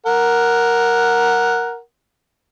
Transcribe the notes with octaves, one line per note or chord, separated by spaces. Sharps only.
A#4 F#5